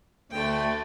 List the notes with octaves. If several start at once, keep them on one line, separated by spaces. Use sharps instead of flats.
D2 D3 A3 G5